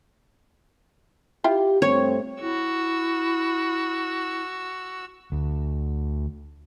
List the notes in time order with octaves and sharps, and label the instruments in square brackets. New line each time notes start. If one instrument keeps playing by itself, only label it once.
[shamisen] E4 F4 G5 [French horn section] G4
[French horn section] G2 A3 C4 [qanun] C#5
[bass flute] E4 [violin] F#4 E6
[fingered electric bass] D2